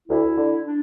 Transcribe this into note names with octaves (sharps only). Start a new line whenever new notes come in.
D2 E4
D3
D4